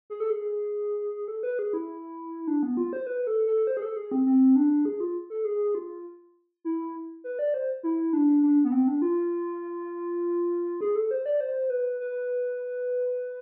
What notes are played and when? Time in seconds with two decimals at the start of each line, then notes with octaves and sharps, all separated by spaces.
0.10 G#4
0.20 A4
0.30 G#4
1.28 A4
1.43 B4
1.59 G#4
1.73 E4
2.48 D4
2.63 B3
2.77 F4
2.93 C5
3.07 B4
3.27 A4
3.47 A4
3.67 C5
3.77 G#4
3.82 A4
3.96 G#4
4.11 C4
4.26 C4
4.56 D4
4.85 G#4
5.00 F4
5.30 A4
5.45 G#4
5.75 F4
6.65 E4
7.24 B4
7.39 D5
7.54 C5
7.83 E4
8.13 D4
8.43 D4
8.64 B3
8.72 C4
8.88 D4
9.02 F4
10.81 G#4
10.95 A4
11.11 C5
11.26 D5
11.40 C5
11.70 B4
12.00 B4